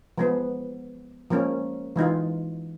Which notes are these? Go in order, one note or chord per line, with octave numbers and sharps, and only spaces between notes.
F3 G#3 B3
F3 G#3 A#3 C#4
E3 G#3 D#4 F4